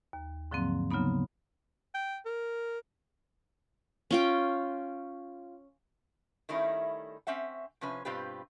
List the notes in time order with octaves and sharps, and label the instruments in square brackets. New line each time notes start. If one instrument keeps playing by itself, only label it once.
[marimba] D#2
G#2 D3 F3 F#3 A#3 C4
C#3 F#3 A#3 B3 D#4
[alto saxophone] G5
A#4
[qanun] C#4 F4 G5
[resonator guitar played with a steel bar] D#3 G3 A3 C#4 D#4 E4
C4 C#4 E5 F#5
C3 F3 C#4 B4
G2 B2 C4 F4 G4 B4